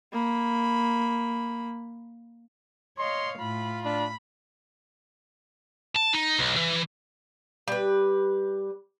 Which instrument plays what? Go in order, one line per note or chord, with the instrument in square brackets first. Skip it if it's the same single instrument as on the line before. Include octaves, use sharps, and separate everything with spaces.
[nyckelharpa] A#3 B5
[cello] C#5 F5 [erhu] D#5 [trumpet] C6
[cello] A2 [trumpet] F4 [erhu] B5
[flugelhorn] D4 [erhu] B5
[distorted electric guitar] A5
D#4
B1
E3
[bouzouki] G3 B4